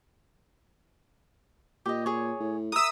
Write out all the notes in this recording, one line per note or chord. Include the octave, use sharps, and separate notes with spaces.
A#2 G4 D#5
G#4 C#5
A2
A#4 E5 D#6 E6